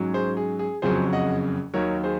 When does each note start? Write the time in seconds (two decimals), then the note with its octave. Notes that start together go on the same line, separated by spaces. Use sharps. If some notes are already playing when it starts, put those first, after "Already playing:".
Already playing: G#2 F#3 C#4
0.14 G#4 C5
0.37 G#4
0.59 G#4
0.82 F#1 F2 C#3 F#3 C#4 G#4 C5
1.13 D#5 F#5
1.74 D#2 D#3 F#3 A#4 C#5
2.04 G#4 C5